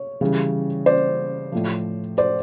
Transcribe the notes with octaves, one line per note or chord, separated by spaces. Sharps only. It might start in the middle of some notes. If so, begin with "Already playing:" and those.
Already playing: C#5
C#3 E3 G3
C5 D5
A2 F3
C5 D5